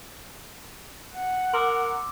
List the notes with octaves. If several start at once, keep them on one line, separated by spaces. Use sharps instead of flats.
F#5
A#4 C6 D6 E6